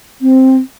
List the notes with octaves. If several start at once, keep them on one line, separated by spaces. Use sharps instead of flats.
C4